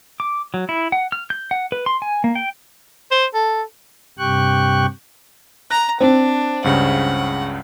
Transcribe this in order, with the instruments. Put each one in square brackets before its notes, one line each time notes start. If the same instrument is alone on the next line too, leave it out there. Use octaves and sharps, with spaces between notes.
[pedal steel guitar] D6
F#3
E4
F#5
F6
G6
F#5
B4
C6
G#5
A#3
G5
[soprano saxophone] C5
A4
[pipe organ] G2 C3 G4 G5 C#6 F#6
[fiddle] A#5 [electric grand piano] F#6 A#6
[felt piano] C4 [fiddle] D4
[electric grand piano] C#2 G2 C#3 [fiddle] F#5